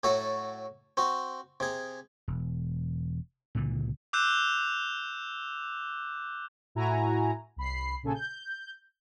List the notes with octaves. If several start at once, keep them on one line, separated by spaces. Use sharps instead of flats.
A2 F#3 F#4 A4 E5
C4 F#4
C3 G#4
E1
C#2 A#2 D3 E3
D6 E6 F#6 G6 E7
A2 E4 F#4 G#5 A#5
C2 B5 C7
A#1 C#3 A4 G#5
G6